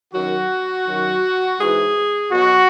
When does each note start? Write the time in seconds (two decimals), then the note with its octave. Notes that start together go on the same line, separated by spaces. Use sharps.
0.14 F#2 D#3 F#3 F#4
0.87 F#2 D#3 F#3
1.59 G#2 E3 G#4
2.32 B2 F#3 F#4